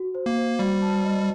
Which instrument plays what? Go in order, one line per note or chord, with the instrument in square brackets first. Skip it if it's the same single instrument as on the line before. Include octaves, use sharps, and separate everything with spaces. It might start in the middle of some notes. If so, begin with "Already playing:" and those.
Already playing: [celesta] F#4
C5
[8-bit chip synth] A#3
[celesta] C5
[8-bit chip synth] G3 [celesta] F#4
[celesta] A5
D#5